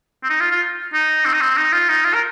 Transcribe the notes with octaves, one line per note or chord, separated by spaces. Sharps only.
C4
D#4
F4
F4
D#4
C4
D#4
C4
D#4
F4
D#4
F4
A#4